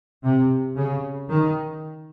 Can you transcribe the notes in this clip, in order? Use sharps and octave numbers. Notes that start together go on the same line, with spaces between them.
C3
C#3
D#3